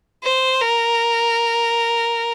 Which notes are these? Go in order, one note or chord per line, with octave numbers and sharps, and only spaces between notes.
C5
A#4